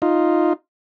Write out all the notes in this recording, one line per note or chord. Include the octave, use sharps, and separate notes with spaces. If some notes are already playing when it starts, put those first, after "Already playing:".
D#4 F4